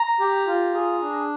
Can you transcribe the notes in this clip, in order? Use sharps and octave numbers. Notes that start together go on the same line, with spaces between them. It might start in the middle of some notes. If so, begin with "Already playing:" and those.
Already playing: A#5
G4
F4
G#4
D4